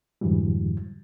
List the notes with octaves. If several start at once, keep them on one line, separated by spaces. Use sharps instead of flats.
F2 G#2 D3 E3 F#3 G3